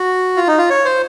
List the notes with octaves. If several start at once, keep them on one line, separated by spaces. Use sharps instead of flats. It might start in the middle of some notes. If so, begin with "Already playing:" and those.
Already playing: F#4
F4
D#4
F4
C#5
C5